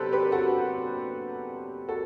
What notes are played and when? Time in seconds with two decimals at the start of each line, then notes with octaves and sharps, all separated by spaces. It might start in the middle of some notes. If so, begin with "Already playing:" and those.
Already playing: C3 F#3 B3 D4 G4 A4 B4 C5
0.12 G4 B4
0.32 F#4 A4
1.88 F#4 A4